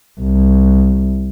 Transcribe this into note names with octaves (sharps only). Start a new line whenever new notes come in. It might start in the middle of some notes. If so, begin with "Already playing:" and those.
C2